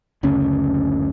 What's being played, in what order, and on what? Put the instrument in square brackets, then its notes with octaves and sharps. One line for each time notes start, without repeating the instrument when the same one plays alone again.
[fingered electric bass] F#1 D2 C#3 C#4